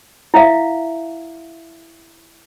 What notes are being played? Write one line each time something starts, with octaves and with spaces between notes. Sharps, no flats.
E4 E5 F5